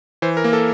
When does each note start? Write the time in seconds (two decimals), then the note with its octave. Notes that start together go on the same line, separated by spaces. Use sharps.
0.22 E3 C5
0.37 A#4
0.44 A#3
0.53 A4